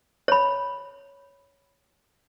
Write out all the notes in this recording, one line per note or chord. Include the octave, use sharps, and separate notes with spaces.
C#5 B5